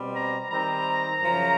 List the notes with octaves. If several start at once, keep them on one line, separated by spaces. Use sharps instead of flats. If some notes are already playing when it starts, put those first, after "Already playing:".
Already playing: B2 G3 C4
A#5
D#3 G3 C4 D#4 A#5
F#2 C#3 F3